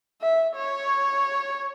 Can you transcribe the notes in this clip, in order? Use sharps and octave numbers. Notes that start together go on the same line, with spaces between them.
E5
C#5